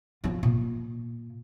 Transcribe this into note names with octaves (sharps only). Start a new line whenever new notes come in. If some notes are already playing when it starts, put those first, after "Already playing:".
F3 F4
A#2